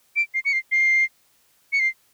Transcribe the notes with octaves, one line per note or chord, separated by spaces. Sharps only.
D7
C7
C#7
C7
C7
C#7
C7